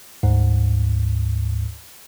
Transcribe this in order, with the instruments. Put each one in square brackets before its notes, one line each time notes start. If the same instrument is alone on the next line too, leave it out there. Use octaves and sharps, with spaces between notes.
[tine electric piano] D2 G#2